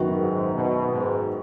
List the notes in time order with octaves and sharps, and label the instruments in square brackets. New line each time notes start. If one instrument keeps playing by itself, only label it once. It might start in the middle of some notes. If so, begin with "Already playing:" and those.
Already playing: [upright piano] F#2 D#3 B3 F#4
[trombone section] G#2
B2
G#2